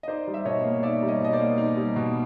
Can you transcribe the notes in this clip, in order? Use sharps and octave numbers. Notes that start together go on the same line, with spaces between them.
D#5
D#4 C5 D5
G3
E5
B2 C#5 D#5
A#3
D#4 D5 E5
G3
C#5 D#5
B2 D#5
C5 D5
A#3
D#4
G3
B2